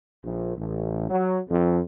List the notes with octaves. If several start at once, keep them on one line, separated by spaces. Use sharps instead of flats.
A#1
A1
F#3
F2